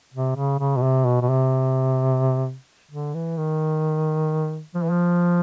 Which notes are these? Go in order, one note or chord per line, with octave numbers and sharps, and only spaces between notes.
C3
C#3
C#3
B2
C3
B2
B2
C3
D3
E3
D#3
F3
E3
F3